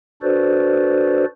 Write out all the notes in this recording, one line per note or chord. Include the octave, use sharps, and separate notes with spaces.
D4 F#4 A4 B4 C5 D5